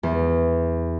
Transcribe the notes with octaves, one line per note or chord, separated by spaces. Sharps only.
E2